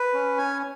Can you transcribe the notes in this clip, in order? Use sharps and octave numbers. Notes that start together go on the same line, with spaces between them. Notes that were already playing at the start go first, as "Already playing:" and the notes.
Already playing: B4
C#4
G#5